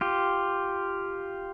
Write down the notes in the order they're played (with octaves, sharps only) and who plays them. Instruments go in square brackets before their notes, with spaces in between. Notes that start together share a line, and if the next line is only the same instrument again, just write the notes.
[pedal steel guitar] F4 G4